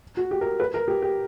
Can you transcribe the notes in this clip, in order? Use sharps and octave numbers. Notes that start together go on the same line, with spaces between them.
F#4
G4
A#4
B4
A#4
G4
G4